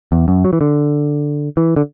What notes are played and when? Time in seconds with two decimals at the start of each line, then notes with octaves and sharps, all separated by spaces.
0.12 E2
0.28 F#2
0.45 F#3
0.53 E3
0.61 D3
1.57 E3
1.76 D3